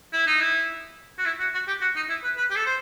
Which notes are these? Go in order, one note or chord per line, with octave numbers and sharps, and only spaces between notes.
E4
D#4
E4
F#4
E4
F#4
F#4
G4
F#4
D#4
E4
B4
B4
G4
A4
C5